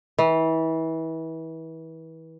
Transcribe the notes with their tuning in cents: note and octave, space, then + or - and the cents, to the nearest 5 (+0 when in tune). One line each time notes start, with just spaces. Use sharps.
E3 -30